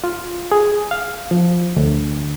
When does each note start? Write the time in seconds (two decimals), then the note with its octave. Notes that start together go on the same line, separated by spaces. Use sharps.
0.04 F4
0.52 G#4
0.91 F5
1.31 F3
1.77 D2